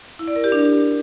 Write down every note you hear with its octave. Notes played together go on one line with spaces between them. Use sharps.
E4
D5
A#4
G4
D4